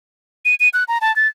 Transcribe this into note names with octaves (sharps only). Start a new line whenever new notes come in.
D#7
D#7
F#6
A#5
A5
A6